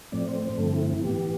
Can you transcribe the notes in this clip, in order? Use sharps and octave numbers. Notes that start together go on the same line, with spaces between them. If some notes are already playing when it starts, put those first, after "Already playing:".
A2 F3 A3 C4 D5
C5
C5
G2 D3 F3 A3 C4 A4
E4
E4
A2 E3 B3 G4